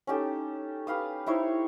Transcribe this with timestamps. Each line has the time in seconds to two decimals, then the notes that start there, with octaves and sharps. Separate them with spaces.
0.07 C#4 D#4 G4 A4
0.87 G4 B4 F5 D#6
1.26 D#4 E4 C5 C#5